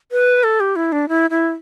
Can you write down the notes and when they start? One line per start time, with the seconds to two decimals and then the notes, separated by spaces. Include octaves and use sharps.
0.12 B4
0.44 A4
0.60 G4
0.76 E4
0.92 D4
1.09 E4
1.30 E4